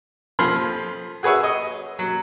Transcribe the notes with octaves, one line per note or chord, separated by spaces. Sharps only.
F2 F3 B5 C6 F6
F#4 G#4 B4 C#5 E5
D#5
F#3